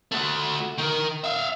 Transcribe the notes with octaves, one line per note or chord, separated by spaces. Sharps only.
A3 F#4
D#3 A#4
E5 F5